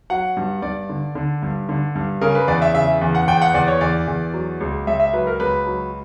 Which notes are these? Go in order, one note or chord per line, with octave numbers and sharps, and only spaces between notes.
F#3 F#5
G2
G2 D5
D3
D3
G2
D3
G2
C#3 A#4
B4
E2 D5
E5
C#3 E5
E2
F#5
E2 G5
F#5
E2 D5
C#5
E2 D5
E2
F#3
C#2
C#2 E5
E5
F#3 B4
A#4
C#2 B4
F#3